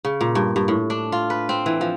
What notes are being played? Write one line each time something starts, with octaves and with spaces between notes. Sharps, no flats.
C#3
A#2
G2
G2
A2
D4
F4
B4
C4
E3
F3